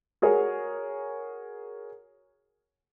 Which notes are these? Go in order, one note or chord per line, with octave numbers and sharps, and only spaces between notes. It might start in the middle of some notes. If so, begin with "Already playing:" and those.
F#4 G#4 A#4 C#5